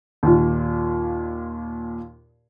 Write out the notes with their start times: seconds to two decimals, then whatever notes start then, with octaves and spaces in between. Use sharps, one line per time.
0.23 D#2 A#2